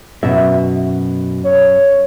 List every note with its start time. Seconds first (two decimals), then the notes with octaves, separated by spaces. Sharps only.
0.23 F#2 B2 E5
1.44 C#5